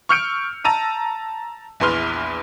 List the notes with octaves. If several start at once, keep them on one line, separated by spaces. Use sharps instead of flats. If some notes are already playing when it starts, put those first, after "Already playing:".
C#6 E6 F6 G6 C#7 D7
A5 A#5 E6 D#7
A#1 E2 B4 C6 F6